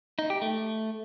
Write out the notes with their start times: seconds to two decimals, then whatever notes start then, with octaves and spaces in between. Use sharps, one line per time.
0.19 D#4
0.30 G4
0.42 A3